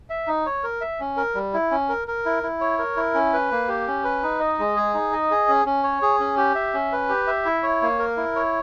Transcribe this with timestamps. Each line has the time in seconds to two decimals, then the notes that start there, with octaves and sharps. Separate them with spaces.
0.10 E5
0.27 D#4
0.46 C#5
0.64 A#4
0.81 E5
1.00 C#4
1.17 A#4
1.35 G3
1.54 E4
1.71 C#4
1.89 A#4
2.08 A#4
2.25 E4
2.43 E4
2.61 C#5
2.78 A#4
2.97 E4
3.14 C#4
3.33 B4
3.51 A#3
3.68 G4
3.87 C#4
4.04 B4
4.23 D#4
4.40 D#5
4.59 G#3
4.76 G#4
4.94 D#4
5.13 D#5
5.31 G#4
5.48 C#4
5.66 C#4
5.83 C#5
6.02 G#4
6.20 C#4
6.37 G4
6.55 E5
6.74 C#4
6.92 B4
7.09 G4
7.27 E5
7.45 E4
7.63 C#5
7.82 A#3
7.99 A#4
8.17 E4
8.36 C#5